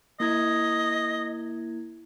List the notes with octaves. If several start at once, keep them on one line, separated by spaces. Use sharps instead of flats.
A#3 E4 D#5 G#6